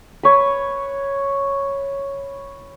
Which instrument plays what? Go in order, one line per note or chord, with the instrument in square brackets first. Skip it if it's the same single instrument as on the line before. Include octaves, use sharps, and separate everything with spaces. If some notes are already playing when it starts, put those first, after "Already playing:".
[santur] B4 C#5